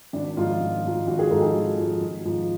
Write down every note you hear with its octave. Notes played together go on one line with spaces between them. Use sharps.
G#1 D4
G#2 F3 F4
G#1
G#2 F3
G#1 F#4
G#4
G#2 F3 A4
G#4
G#1
G#2 F3
G#1
G#2 F3